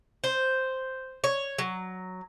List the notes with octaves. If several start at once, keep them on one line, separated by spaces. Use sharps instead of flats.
C5
C#5
F#3